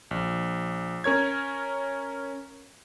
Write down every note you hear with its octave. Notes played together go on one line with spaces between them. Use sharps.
A#1
C#4 A#4 C#5 G#6